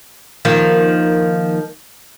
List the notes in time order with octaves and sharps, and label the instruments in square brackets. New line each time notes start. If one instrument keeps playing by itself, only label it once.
[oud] D#3 F3 A#3